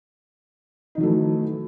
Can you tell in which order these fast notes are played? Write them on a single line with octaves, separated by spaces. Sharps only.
D#4 D#3 F#3 A3 E3